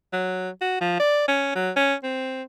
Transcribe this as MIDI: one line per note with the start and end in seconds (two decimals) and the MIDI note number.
0.13 0.50 54
0.61 0.80 66
0.81 0.98 53
1.00 1.24 74
1.28 1.54 61
1.55 1.71 54
1.76 1.94 61
2.03 2.43 60